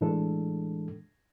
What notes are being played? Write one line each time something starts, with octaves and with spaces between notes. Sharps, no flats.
A2 E3 G#3 D4 A4